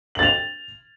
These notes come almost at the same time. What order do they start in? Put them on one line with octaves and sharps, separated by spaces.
F#7 A6 F7